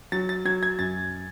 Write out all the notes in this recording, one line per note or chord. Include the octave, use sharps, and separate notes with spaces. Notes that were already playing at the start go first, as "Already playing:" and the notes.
F#3 A6
A6
F#3 G#6
G#6
F#2 A6